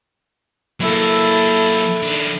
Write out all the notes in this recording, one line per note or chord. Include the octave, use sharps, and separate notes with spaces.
F#3 A#3 E4 A4
D#3 D4